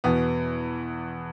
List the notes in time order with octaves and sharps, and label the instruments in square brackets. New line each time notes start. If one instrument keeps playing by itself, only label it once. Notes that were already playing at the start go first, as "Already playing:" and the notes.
[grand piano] E2 B2 B3